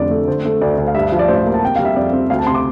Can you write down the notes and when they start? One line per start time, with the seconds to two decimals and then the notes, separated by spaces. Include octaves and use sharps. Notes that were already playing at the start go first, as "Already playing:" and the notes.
Already playing: F1 F2 D3 D5
0.11 A3
0.27 D3 C5
0.45 A3
0.61 D2 D5
0.78 D2
0.87 F5
0.95 G2 E5
1.12 F3
1.19 D5
1.28 A1 C5
1.46 A#3
1.54 A5
1.62 C3 G5
1.76 G3 F5
1.85 E5
1.96 F2 D5
2.13 C4
2.30 D2 F5
2.39 A5
2.47 C3 C6
2.54 D6